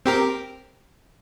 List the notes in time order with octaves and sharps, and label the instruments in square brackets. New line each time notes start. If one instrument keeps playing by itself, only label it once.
[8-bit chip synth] C4 G4 A#4